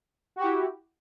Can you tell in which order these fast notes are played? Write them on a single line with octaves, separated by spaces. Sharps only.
F#4 G4 E4